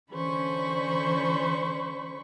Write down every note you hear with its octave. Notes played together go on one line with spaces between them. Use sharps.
D3 E3 C#4 C5 B5 C#6